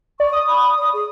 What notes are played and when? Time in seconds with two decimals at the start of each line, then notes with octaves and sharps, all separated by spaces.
0.20 D5 C#6
0.33 D#6
0.48 B5
0.78 D5
0.93 G#4